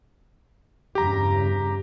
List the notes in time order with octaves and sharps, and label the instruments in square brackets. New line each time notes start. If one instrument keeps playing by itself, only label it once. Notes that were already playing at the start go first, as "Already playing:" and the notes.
[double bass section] E2 G2 C#3 [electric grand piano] G4 A#5